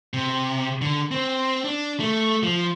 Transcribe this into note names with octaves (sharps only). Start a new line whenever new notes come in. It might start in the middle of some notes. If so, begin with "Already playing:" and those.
C3
D3
C4
D4
A3
F3